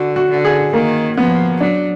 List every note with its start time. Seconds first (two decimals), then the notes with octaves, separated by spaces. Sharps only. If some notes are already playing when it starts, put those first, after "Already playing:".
Already playing: D3 F#4
0.16 F#4
0.30 D3
0.45 G#4
0.73 D#3 A#3
1.17 F3 B3
1.60 F#3 D4